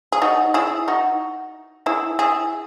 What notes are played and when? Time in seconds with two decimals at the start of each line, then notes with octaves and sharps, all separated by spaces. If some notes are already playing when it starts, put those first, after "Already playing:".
0.12 G#4
0.22 D#4 F#4
0.54 E4 G#4
0.88 D#4 F#4
1.86 E4 G#4
2.19 E4 G#4